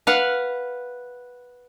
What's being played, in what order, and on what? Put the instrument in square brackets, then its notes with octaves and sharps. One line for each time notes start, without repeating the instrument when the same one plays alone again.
[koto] B4 F5 F#5